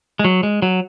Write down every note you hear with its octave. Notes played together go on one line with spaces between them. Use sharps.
G#3
F#3
G#3
F#3